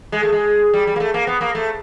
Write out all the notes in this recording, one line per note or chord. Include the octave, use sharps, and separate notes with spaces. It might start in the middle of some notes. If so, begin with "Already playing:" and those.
G#3
A3
G#3
G3
G3
A#3
A3
A#3
B3
A#3
A3